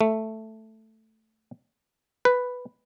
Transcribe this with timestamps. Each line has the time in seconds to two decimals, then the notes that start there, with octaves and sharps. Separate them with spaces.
0.01 A3
2.25 B4